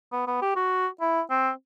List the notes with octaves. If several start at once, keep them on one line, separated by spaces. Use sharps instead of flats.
B3
B3
G4
F#4
E4
C4